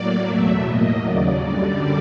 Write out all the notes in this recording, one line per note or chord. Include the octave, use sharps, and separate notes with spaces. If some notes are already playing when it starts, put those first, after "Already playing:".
Already playing: A2 F#3 A#3 D5
E2 B2 F#3 A3 E5
A2 F#3 A#3 D#5
D#2 C#3 F#3 D5
F#2 D3 G3